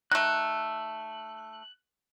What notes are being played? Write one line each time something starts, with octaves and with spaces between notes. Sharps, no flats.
D#3 A3 F#6